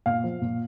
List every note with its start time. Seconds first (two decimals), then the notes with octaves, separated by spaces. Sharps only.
0.06 A#2 F5
0.24 F3
0.41 A#2